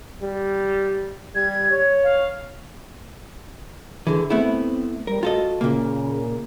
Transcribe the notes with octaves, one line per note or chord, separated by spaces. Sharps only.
G3
G3 G#6
C#5
F5
D3 E3 G#4
A3 B3 C4 E4
G3 A#4
F4 F#4 A4 D#5
A#2 C#3 A#3